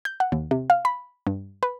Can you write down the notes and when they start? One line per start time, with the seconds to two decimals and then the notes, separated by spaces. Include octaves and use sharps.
0.05 G6
0.20 F#5
0.32 D#2
0.51 C3
0.70 F5
0.85 B5
1.27 G2
1.63 B4